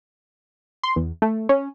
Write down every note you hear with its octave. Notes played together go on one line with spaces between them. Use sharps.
C6
E2
A3
C#4